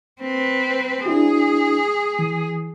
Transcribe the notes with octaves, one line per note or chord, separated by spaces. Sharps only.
C4 B4
D4 E4 F#4 G#4
E3